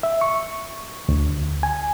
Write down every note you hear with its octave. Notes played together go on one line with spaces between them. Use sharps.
E5
C#6
D2
G#5